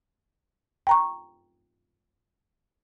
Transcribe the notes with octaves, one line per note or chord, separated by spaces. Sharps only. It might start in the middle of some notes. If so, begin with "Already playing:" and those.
G5 A#5 C#6